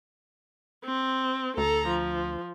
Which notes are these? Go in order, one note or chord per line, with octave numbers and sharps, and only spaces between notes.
C4
D2 A4 A#5
F3